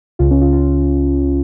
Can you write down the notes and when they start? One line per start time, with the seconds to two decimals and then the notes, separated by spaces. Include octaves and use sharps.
0.19 C#2 C#3 F4
0.31 C#4
0.41 F4
0.53 F4